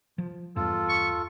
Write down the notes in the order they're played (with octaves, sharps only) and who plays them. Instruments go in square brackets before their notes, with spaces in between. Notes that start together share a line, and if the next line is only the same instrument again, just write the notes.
[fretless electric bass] F3
[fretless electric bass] E2 G2 [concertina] F4 A4
[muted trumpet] C#6